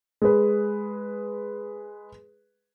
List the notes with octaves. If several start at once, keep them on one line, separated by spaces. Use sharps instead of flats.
G#3 G#4 B4